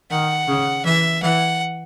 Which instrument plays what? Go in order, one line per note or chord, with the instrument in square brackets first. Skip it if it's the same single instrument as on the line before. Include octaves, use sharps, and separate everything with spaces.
[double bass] D#3 [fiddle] F#5
[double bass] C#3
[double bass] E3 [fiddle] E5
[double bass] E3 [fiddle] F#5